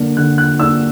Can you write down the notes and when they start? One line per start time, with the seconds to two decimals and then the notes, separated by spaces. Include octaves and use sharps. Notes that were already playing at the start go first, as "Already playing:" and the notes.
Already playing: D3 A#3 D4
0.17 D3 F#6
0.38 F#6
0.60 A#3 D4 E6